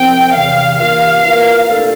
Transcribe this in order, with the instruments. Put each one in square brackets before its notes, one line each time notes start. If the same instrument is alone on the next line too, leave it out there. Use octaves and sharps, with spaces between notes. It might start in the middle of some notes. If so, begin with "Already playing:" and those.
Already playing: [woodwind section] C2 C3 F3 C4 [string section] G5
[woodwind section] E2 C3 E3 [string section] F5
[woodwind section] G2 E3 A#3 F4 A#4 [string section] F5
[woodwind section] E3 A#3 F4 A#4
C2 A#2 A3 D4 A4